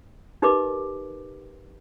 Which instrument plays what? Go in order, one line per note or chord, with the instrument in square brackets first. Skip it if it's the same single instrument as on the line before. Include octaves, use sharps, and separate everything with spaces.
[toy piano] D#4 G4 A#4 B4 D#5 D6